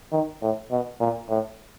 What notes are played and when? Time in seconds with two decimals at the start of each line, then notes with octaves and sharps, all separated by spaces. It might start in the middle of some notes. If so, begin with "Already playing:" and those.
0.12 D#3
0.41 A2
0.71 B2
1.00 A#2
1.29 A2